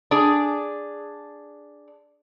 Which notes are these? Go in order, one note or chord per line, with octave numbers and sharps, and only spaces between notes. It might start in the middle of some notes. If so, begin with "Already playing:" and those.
D4 G#4